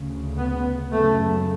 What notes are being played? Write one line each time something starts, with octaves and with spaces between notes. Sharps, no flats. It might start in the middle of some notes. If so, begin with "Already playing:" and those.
Already playing: D2 C#3
B3
F#2 C#3 A3